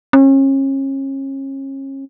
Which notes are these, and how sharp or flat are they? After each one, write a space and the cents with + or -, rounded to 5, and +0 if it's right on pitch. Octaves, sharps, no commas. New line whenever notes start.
C#4 -35